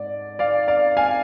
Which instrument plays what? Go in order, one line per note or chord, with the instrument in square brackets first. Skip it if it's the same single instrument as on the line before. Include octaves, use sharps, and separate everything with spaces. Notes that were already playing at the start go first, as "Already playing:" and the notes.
Already playing: [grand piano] G#2 D5
D5 F5
D5 F5
F5 G#5